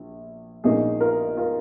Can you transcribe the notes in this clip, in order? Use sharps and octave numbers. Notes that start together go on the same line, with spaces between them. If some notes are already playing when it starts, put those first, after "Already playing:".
Already playing: A#1
A#1 A#2 A#3 C#4 D#4 G#4
F4 A#4
F4 A#4